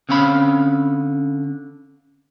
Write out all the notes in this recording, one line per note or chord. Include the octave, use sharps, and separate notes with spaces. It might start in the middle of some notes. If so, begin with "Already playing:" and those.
D3 C4 C#4 F5 B5